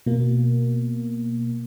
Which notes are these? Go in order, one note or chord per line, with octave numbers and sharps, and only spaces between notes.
B2 A#3